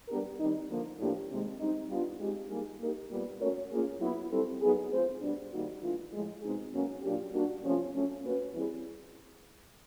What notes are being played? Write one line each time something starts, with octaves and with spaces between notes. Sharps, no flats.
G3 B3 D4 G4 A#4
D#3 G3 C4 D#4
D3 F3 A#3
A2 F3 A#3 D4 G4
C3 D#3 G#3
G3 C4 D#4
G3 B3 D4 F4
G#3 C4 D#4 G4
G3 A#3 D#4 G#4
A#3 D#4 G4 A#4
A#2 G3 B3
A3 C#4 F#4 A#4 C#5
A#3 C#4 F4 G#4
F#3 B3 E4
G3 C4 E4 A4
F#3 B3 D#4 G#4
A3 C4 F4 G#4 C5
B2 G3 B3 D4
D#3 G3 A#3 D#4 F#4
E3 A3 D4 F4
A2 F3 G#3
B2 G#3 C4 D#4 G#4
B2 F#3 A#3 C#4
A#2 F#3 A#3 D4 G4
G3 A#3 D4 F#4
C3 F3 A3 C#4 F4
F#3 A3 C#4
A#3 C#4 F#4 B4
E3 G3 C4 E4 G#4